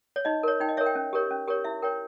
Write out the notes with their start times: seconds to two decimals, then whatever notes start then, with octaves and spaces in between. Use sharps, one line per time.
0.16 C#5
0.25 D#4 D#5
0.43 A#4 C#5
0.60 D#4 G5
0.69 D#5
0.77 A#4 C#5 E5
0.86 G5
0.95 C#4
1.13 G4 A#4 C#5
1.31 C#4
1.48 G4 A#4 C#5
1.64 E4 E5
1.82 A#4 C#5 G5